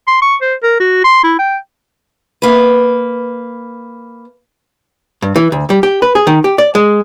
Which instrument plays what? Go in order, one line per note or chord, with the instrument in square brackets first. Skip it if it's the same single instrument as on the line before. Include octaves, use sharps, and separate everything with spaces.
[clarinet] C6
C#6
C5
A#4
F#4
C6
E4
G5
[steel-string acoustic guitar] A#3 B4
[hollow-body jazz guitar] G2
E3
D2
G3
G4
B4
G#4
D#3
G4
D5
G#3